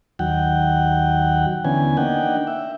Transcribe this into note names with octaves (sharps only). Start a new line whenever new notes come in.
D#2 F#3 F#5 G5
D3 E3 B3 C#4 G#5
A#3 D4 D#4 F#5 G5
E5